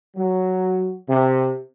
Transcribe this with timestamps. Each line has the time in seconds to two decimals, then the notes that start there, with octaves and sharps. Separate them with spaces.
0.16 F#3
1.08 C3